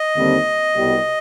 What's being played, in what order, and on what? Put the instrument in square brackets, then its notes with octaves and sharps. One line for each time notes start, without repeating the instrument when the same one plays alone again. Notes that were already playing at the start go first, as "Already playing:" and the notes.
Already playing: [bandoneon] D#5
[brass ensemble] D#2 D3 G3 C4
C2 B2 G3